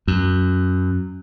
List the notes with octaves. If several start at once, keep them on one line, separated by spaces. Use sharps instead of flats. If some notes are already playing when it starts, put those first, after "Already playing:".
F#2